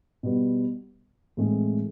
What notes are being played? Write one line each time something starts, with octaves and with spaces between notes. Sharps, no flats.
B2 G3 B3
A2 E3 G#3 C4